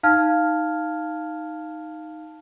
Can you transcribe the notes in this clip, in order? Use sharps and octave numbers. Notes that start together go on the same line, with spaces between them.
D#4 F5 A5 F6 G#6